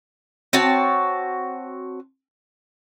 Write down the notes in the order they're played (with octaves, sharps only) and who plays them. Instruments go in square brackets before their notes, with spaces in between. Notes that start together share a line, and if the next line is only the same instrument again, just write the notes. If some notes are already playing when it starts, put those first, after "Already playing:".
[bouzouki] C4 F#4 C#5 A5